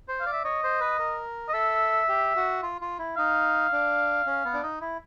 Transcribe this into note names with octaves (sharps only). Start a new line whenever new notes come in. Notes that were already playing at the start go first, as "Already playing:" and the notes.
C5
F5
D5
E5
C#5 D#5
C5
B4
A#4
D#5
A4 E5
G4
F#4
F4
F4
E4
D#4 F5
D4
C#4
B3
D4
D#4
E4